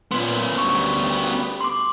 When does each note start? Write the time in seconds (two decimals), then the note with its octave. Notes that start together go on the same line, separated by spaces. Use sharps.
0.12 A#2 B3 C#4 C6
0.58 D2 G3 C#6
1.61 C6 D6